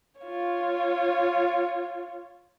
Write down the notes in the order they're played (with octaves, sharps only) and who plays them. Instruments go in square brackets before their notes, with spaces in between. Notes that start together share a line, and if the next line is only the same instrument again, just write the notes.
[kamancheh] F4 C#5